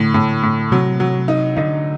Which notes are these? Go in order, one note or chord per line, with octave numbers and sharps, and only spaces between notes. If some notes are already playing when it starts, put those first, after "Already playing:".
Already playing: A2 D3
A2
A2
C3 F#3
F#3
D#4
D3 D#4